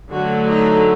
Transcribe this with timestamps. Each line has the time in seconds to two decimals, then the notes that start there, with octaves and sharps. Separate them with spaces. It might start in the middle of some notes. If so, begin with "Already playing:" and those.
0.11 D3 F#3 A3 F#4
0.48 D#4